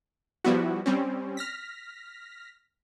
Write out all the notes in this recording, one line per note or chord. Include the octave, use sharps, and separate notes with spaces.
F3 G3 B3 E4 F#4
G3 C4 C#4
F6 A#6 B6